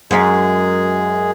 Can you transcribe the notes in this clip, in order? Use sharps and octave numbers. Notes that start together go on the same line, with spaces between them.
F#2 G#3 G#4